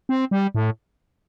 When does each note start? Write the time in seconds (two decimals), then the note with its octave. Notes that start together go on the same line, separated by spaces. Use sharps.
0.09 C4
0.31 G3
0.55 A2